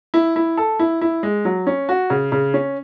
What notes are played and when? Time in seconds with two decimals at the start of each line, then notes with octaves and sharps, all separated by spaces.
0.14 E4
0.36 E4
0.57 A4
0.79 E4
1.01 E4
1.23 G#3
1.45 F#3
1.67 C#4
1.89 F#4
2.10 C#3
2.32 C#3
2.54 C#4